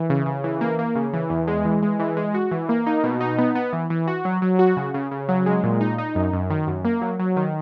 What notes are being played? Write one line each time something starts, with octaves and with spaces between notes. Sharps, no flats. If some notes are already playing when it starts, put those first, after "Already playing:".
Already playing: E3
C#3
C#3
E3
A#3
A#3
C#3
E3
E2
G#3
E3
G#3
E3
G#3
F#4
E3
A#3
D#4
B2
D#4
B3
B3
E3
E3
F#4
F#3
F#3
F#4
C#3
C#3
C#3
F#3
G#3
A#2
D#4
D#4
F#2
F#2
D#3
F#2
A#3
F#3
F#3
D#3